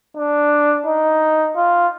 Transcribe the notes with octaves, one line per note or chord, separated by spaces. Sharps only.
D4
D#4
F4